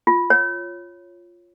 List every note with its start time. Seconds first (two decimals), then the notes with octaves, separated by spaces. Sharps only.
0.07 F4
0.30 C#5